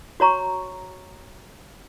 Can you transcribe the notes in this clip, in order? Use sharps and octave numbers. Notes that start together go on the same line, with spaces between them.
F#4 C#5 A#5 C#6